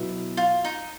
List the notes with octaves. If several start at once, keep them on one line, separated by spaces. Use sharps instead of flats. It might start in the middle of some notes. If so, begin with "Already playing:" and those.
Already playing: B2 F#3 B3 E4
F4
D#4